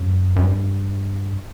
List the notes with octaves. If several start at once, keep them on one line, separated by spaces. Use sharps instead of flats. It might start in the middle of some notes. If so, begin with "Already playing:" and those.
Already playing: F#2
F#2
G2